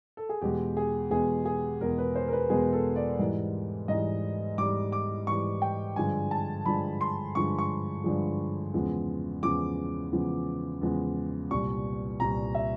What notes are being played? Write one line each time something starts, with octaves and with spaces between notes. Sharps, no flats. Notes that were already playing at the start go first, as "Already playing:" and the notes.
A4
G#4
E2 B2 G#3 G4
G#4
E2 B2 G#3 G#4
G#4
E2 B2 G#3 A#4
B4
C5
A#4
B4
E2 B2 G#3 G#4
A4
D5
G#2 E3 G3
G#2 E3 G3 D#5
G#2 E3 G3 D6
D6
G#2 E3 G3 C#6
G5
G2 D3 F3 G#3 G#5
A5
G2 D3 F3 G#3 B5
C6
G2 D3 F3 G#3 C#6
C#6
G2 D3 F3 G#3
E2 C#3 F3 G#3
E2 C#3 F3 G#3 D6
E2 C#3 F3 G#3
E2 C#3 F3 G#3
C2 A#2 G3 C#6
C2 A#2 G3 A#5
E5